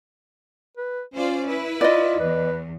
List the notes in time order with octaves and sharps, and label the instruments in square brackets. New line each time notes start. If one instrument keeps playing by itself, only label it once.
[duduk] B4
[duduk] C#4 [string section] F4 C5 D5
[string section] E4 B4
[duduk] F4 [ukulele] D5 D#5
[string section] E2 [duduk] B4